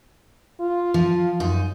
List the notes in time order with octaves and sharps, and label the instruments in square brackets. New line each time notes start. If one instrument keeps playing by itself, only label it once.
[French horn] F4
[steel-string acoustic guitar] F3
F#2 D#4